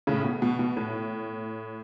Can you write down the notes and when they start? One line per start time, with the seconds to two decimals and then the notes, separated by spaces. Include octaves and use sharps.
0.07 A2 C#3
0.24 B2
0.42 B2
0.59 B2
0.77 A2